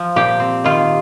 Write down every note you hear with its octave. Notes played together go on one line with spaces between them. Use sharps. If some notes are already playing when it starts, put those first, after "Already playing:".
Already playing: F3
A#2 G4
C4
D#3 F4